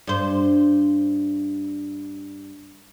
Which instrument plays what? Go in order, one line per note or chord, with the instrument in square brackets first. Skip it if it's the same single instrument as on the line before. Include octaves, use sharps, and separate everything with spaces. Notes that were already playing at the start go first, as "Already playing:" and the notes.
[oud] G2 C5